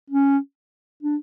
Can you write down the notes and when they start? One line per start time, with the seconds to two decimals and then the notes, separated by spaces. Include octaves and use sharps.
0.10 C#4
1.03 D4